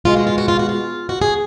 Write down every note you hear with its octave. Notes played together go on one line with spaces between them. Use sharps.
B2 G#3 F4
F#4
F4
F#4
F4
F#4
F4
F#4
G#4